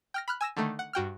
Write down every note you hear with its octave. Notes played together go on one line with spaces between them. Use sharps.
G5 F6 A#6
B5 F6 F#6
G#5 E6 A#6 E7
D3 D#3 A3
F#5
G2 F#4 G5 F6